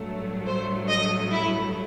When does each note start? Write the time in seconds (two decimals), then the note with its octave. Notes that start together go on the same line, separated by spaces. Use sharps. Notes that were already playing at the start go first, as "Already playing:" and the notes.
Already playing: A1 G2 F#3 A3
0.46 C5
0.89 D#5
1.31 E4